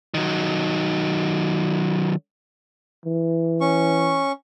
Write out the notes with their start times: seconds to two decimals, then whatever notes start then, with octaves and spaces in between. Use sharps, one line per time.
0.14 D#3 F#3
3.06 E3
3.61 C#4 C#6